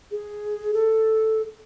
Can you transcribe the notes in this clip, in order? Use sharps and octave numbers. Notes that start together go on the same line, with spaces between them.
G#4
A4